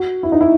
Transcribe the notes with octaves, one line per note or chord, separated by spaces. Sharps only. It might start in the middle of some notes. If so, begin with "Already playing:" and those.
Already playing: F#4
E4
D#4
E4